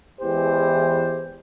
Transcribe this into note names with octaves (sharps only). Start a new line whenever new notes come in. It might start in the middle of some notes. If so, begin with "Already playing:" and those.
E2 E3 G#3 G4 C5